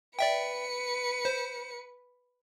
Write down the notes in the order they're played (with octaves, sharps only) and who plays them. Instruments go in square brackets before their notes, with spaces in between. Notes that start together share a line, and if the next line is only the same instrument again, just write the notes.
[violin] B4 C#7 [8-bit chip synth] D5 E5 G5
[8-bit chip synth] C5